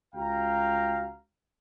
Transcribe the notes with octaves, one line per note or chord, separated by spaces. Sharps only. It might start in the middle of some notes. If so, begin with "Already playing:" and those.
C#2 F#4 F5 G5 A#5